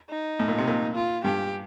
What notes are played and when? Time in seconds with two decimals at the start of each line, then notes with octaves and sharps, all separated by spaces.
0.10 D#4
0.39 A2
0.48 A#2
0.58 C3
0.68 A#2
0.95 F4
1.24 G2 G4